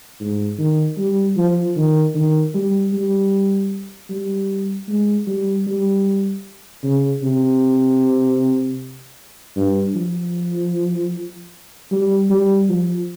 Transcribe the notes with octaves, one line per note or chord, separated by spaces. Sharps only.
G#2
D#3
G3
F3
D#3
D#3
G3
G3
G3
G#3
G3
G3
C#3
C3
G2
F3
G3
G3
F3